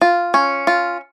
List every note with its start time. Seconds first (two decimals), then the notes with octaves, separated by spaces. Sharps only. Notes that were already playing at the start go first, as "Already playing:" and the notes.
0.01 F4
0.34 C#4
0.67 F4